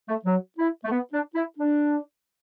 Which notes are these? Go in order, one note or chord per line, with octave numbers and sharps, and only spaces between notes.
A3
F#3
E4
A3
B3
D4
E4
D4